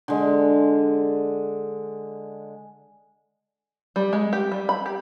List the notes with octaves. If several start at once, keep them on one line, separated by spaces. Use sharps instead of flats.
D3 G#3
G3
G#3
G4
G3
B5
G4